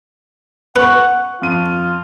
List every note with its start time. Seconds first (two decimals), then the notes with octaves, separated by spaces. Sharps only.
0.76 B3 C#4 B4 F#5 C#6 F#6
1.42 F2 F4 D#7